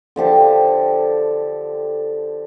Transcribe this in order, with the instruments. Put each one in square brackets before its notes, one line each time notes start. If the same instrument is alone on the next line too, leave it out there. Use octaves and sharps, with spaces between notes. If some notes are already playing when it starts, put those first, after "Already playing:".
[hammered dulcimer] D3 F3 G4 A4